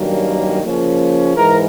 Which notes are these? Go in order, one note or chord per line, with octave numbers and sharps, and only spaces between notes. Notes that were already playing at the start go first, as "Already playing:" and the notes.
Already playing: G2 D#3 F#3 A#3 C#4
C#3 F3 A#3 C#4
G#2 E3 A#4